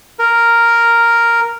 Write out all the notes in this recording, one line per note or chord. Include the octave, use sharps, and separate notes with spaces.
A#4